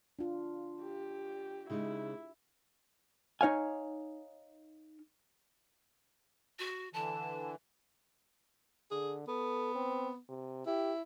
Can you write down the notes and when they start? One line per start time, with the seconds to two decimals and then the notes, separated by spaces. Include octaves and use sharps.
0.19 D4 F4
0.83 G4
1.70 C#3 G#3 D#4 E4
3.41 D#4 C#5 F5 G#5
6.59 F#4
6.93 D3 E3 A5
8.91 D3 G#4
9.28 B3 A4
9.75 C4
10.29 C3
10.67 E4 G4